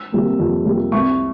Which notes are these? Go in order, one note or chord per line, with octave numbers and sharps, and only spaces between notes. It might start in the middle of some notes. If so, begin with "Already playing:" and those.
Already playing: E6
C3 G3 A#3
F2
C3 G3 A#3
C2 C#6